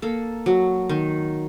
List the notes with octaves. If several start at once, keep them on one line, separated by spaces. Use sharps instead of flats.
A#3 A4
F#3
D#3